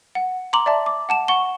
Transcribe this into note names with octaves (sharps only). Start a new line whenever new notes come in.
F#5
A#5 C6 D6 F#7
D5 E5 A5
D6
F#5 A5 E7
F#5 C#6 G7